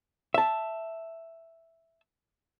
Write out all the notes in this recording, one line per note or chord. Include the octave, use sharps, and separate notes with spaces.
E5 A5